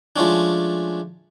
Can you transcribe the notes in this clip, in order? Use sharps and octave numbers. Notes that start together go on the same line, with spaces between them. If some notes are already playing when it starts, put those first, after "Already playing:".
F3 G#3 A3 C#4 D4